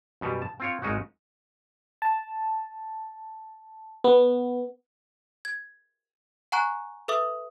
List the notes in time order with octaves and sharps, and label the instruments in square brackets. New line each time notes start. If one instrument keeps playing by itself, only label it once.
[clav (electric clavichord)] F#2 B2 G3
A5
C4 F4 C#5
G#1 G#3 C#4 D#4 F#4
[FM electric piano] A5
B3
[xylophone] G#6
F#5 G#5 A#5 C#6 F#6
A4 B4 E5 D6 D#6